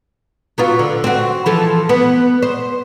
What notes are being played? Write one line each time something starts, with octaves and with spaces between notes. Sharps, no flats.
F#3 B3 F4
D3
C4 F#4
E3 F3 A4
B3
C5